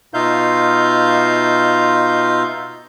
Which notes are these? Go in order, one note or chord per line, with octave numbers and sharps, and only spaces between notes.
B2 D#4 F4 E5 F5 G6